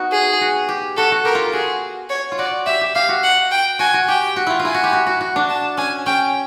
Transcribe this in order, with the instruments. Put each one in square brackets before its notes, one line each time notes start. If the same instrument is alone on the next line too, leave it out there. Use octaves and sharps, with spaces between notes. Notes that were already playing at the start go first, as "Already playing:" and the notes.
Already playing: [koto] B3 D#4 F#4
[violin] G#4
[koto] F#4
G4
[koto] F#4 [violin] A4
[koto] F#4
[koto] G4 [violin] A#4
[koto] F4
[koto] F#4 [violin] G#4
[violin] C#5
[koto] F4
[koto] F#4 [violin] D5
[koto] G4 [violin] E5
[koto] G4
[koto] G4 [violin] F5
[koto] F#4
[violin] F#5
G5
[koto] F#4 [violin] G#5
[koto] F#4
[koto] G4 [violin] G5
[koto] F#4
E4 F4
F4
[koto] E4 [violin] G#5
[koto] F#4
G4
F#4
F#4
F#4
D4
[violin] A5
[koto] C#4 [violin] G#5
[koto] C#4 [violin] G5